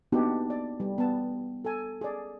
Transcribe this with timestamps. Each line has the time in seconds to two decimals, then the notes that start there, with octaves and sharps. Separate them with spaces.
0.12 A#3 B3 D4 D#4 F#4 G4
0.50 D5
0.80 G3
0.98 B3 A5
1.65 A4 G#5
2.01 G#4 D5